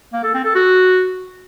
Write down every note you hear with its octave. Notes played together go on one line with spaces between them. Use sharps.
A#3
A4
C4
A4
F#4